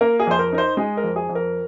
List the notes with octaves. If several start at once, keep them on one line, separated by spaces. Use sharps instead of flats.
A#3 A#4
G#4
F2 C5
A#4
D#4 A#4
C5
G#3 G#4
A#4
F2
G#4
F2
A#4